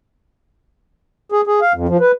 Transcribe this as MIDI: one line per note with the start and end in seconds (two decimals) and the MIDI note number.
1.32 1.41 68
1.47 1.60 68
1.61 1.73 77
1.74 1.87 41
1.89 1.97 53
2.00 2.12 71